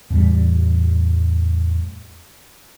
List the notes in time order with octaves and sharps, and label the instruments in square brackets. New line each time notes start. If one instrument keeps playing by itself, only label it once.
[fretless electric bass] E2 A2 G3